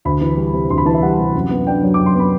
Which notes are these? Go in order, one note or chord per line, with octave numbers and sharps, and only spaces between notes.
D2 B5
E3
G3
C3
D2 C6
B5
E3 A5
E5
G3 F#5
C3
F#2
B3
D4 G5
F#3
F#2 D6
C6
B3 B5